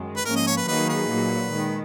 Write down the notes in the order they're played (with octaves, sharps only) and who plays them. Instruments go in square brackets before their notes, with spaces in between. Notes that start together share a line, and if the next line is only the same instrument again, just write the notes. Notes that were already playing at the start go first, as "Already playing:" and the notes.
Already playing: [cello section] F#2 D#3 G#3
[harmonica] B4
[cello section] G#2 F3 A#3 C#4 [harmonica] A#4
[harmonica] D#5
C#5
B4
[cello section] D#3 F#3 A#3 D#4 G#4 [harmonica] B4
[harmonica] B4
[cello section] A#2 F#3 A#3
D#3 G#3